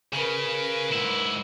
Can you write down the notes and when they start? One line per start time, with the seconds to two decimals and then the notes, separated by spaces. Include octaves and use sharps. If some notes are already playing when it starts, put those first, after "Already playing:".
0.13 C#3 A#4 B4
0.93 G#2 E4